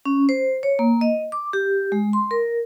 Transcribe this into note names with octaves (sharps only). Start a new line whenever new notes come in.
C#4
C5
C#5
A#3
D#5
D6
G4
G#3
C6
A#4